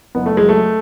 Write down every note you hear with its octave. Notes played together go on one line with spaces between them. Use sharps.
F#1 B3
A3
F#3 G#3
A3